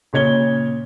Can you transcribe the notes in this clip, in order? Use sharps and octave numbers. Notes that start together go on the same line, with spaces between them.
A#2 C#3 C#5 G#6 G7